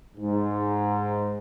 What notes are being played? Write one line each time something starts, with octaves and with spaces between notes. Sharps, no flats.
G#2